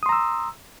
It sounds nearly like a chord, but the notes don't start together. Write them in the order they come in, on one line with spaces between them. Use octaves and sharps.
D#6 C6 A#5 E6